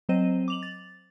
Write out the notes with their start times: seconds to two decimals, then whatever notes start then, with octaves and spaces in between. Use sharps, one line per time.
0.09 F#3 C4 C5 D#5 D#7
0.48 D6 F7 F#7
0.63 A6